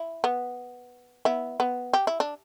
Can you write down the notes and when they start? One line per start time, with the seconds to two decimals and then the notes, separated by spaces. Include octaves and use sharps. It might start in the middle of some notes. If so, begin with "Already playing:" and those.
Already playing: E4
0.24 B3
1.25 B3 E4
1.60 B3
1.93 G4
2.07 E4
2.20 D4